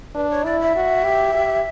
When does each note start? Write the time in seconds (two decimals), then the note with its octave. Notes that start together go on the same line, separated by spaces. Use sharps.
0.15 D4 B4
0.30 C#5
0.45 E4 D5
0.60 E5
0.76 F#4
1.05 G4
1.35 G4